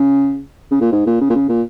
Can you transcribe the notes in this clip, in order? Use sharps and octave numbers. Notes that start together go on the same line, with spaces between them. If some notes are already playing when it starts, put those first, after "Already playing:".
Already playing: C#3
C#3
A#2
G#2
A#2
C#3
A#2
C#3
A#2